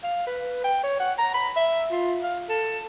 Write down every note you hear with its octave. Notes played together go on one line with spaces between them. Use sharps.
F5
B4
G5
C#5
F#5
A#5
B5
E5
F4
F5
A4